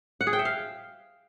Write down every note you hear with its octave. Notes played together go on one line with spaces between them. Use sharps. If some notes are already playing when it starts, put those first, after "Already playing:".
F#5
G#4
G5
E5
F5